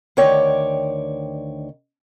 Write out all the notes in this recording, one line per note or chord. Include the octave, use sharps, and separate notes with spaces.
D2 D#3 C#5 D5 G5